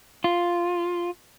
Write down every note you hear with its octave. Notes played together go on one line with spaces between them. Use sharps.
F4